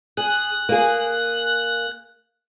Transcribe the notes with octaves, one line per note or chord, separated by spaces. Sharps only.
G#4 F#6
A#3 G#4